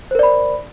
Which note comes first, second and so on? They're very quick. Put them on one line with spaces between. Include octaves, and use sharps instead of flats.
C5 A#4 D5 B5